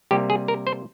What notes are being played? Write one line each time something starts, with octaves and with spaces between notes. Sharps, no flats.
C3 G3 A#3 G4
G#4
A#4
C5